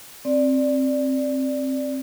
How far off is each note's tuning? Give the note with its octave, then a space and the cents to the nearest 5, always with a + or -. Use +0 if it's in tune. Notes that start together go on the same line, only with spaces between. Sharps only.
C4 +15 D5 +0